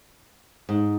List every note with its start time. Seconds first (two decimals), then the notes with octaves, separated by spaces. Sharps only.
0.69 G#2